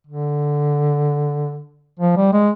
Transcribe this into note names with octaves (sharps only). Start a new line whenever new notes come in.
D3
F3
G3
G#3